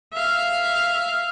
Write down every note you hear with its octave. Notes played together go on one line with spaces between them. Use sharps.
E5 F5